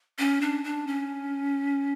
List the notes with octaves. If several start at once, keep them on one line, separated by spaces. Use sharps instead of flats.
C#4
D4
D4
C#4